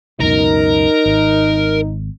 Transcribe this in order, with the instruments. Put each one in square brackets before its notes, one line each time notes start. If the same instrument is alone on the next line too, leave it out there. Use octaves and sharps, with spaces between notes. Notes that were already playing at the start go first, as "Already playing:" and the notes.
[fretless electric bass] C#2 F#2 B2 [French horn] D#4 [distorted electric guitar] A#4
[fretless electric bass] G#1